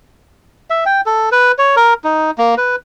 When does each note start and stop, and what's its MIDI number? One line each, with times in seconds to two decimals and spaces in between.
0.70 0.84 76
0.86 1.01 79
1.06 1.29 69
1.32 1.52 71
1.58 1.75 73
1.76 1.94 70
2.04 2.31 63
2.38 2.55 58
2.58 2.76 71